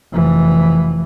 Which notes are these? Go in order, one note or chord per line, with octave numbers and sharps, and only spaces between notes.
F1 E3